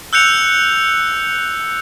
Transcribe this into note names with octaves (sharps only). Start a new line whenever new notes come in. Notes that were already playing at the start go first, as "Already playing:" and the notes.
E6 F#6 G6 C#7 F7